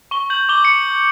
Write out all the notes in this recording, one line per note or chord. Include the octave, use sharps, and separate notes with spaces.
C#6 G7
G6 F#7
D6 G7
C#7